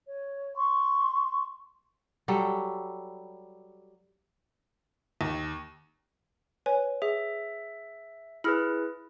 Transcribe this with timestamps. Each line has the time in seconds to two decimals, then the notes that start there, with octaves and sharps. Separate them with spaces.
0.08 C#5
0.56 C6 C#6
2.28 F#3 G3 A4
5.21 D#2
6.66 B4 C#5 G#5
7.02 G#4 E5
8.44 E4 G#4 B4 B5 E6 F6